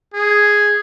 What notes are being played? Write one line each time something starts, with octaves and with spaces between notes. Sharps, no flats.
G#4